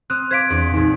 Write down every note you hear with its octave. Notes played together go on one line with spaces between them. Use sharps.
C4 D#6 F6 F#6
C5 F5 D6 G#6 B6 D7
E2 D4
A#1 E2 D#4